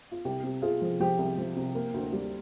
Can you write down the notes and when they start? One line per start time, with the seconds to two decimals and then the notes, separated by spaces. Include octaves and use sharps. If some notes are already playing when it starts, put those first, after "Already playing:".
0.11 F4
0.25 C2 G4
0.43 C3
0.62 C3 F4 G#4
0.81 F3
1.00 F3 G4
1.18 C2
1.38 F3
1.56 C3
1.75 A#3
1.94 D2
2.13 G3